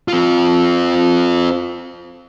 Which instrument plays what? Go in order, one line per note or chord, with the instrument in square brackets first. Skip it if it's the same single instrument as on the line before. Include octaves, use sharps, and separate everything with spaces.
[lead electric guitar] C4 F4